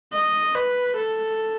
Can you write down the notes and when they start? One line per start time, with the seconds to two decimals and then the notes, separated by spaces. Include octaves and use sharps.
0.13 D#5
0.55 B4
0.96 A4